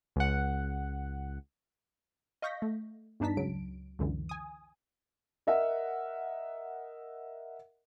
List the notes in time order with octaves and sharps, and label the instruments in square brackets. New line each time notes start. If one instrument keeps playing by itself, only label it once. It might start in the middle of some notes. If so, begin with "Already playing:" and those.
[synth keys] C#2 F#5
[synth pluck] D#5 F5 C#6 G6 A#6 B6
A3
E2 G2 D4 D#4 A5 B6
C#2 C#3 F#3 D7
C#2 F#2 D3 E3
G#5 D#6
[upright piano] A#4 D#5 E5 F#5